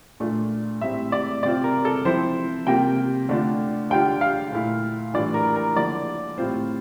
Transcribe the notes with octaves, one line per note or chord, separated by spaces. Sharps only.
A#2 A3 D4 F4
A2 G3 C4 E5
D5
C3 G3 C4 F4 D5
A#4
A4
F3 C4 E4 C5
C3 G3 A#3 F4 G5
D3 A3 D4 F4
D3 G3 D4 F4 G5
F5
A#2 A3 E4
A2 E3 G3 D4 F4 D5
A#4
A#4
D3 F3 A#3 E4 D5
A2 G3 C4 F4 C5